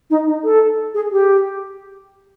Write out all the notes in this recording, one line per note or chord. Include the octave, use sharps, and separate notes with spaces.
D#4
D#4
A4
G#4
G4